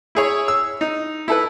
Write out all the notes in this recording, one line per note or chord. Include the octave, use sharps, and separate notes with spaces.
E4 G#4 C#5
E6
D#4
E4 A4 B4